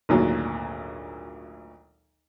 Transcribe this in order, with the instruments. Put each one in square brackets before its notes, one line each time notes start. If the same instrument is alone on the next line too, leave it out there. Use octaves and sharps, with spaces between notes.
[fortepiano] G#1 D2 A#2 F#3